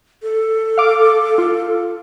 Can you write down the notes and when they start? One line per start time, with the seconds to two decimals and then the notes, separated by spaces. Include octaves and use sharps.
0.23 A4
0.78 F5 D6
1.38 F4